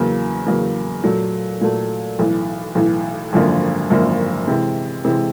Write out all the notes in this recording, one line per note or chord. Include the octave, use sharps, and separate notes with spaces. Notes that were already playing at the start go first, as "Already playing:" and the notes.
Already playing: E2 C#3 F#3 A#3
E2 C#3 F#3 A#3
A#2 F#3 A3
A#2 F#3 A3
B1 A2 E3
B1 A2 E3
G#1 F#2 D3 F3 A#3
G#1 F#2 D3 F3 A#3
C3 E3 G#3
C3 E3 G#3